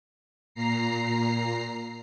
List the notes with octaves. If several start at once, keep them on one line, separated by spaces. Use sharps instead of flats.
A#2 A#5 C7